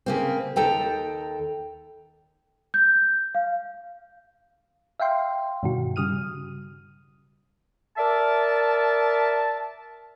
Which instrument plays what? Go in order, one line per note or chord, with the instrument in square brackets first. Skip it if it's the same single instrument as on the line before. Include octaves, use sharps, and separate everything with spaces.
[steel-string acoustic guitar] C#3 A#3 C4
D#2 A4 G5 A#5
[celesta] G6
F5
[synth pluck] E5 F5 G5 C6
G2 B2 D#3 F#4
C#3 G3 D#6 F6 D#7
[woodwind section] A#4 D5 E5 A5